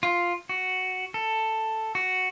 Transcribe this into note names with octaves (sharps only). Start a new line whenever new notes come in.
F4
F#4
A4
F#4